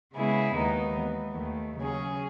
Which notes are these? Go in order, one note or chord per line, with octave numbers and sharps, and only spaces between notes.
C#3 G#3 B3 E4 G#4
D#2 D#3 G#3 B3 D#4
E3 G#3 B3
D#2 D#3 A3
C#3 F#3 C#4 G#4